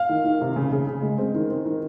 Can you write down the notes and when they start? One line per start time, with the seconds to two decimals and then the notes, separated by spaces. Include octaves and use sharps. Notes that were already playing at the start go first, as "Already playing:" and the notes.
Already playing: F5
0.09 D#3
0.25 D#3
0.41 C3
0.56 C#3
0.72 C#3
0.87 C#3
1.02 G#3
1.18 C4
1.35 D#3
1.50 C4
1.65 D#3